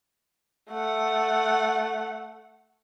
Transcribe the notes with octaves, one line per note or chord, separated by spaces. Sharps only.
A3 F#5